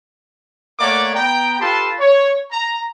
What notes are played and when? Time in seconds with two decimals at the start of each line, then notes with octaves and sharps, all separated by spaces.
0.79 A3 A#3 C#5 D5 F#5 D6
1.15 B3 G5 A#5
1.60 F4 G4 A4 B4 A5 C6
1.99 C#5
2.52 A#5